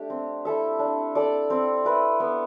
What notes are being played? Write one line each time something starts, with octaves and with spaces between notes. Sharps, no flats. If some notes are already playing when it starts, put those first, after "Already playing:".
Already playing: A3 D4 G4
C4
E4 A4 E5
D4
A4 D5
C4
E4 B4
B3